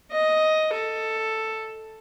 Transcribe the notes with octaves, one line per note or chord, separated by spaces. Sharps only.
D#5
A4